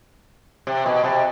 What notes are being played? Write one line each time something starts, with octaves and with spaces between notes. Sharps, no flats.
C3
B2
C3